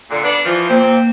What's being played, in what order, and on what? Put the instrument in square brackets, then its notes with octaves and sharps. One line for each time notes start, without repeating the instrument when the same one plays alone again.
[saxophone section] A#2 D3
B3 D4
E3 F3
[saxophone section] A#2 C4 [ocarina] A#3